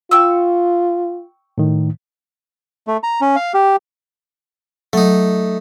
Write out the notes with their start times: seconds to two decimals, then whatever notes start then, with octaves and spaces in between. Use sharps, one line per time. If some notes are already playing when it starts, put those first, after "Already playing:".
0.11 F4 G5 C#6 E6
1.58 A2 D#3
2.87 A3
3.03 A#5
3.21 C#4
3.36 F5
3.54 G4
4.93 F#3 A3 D#4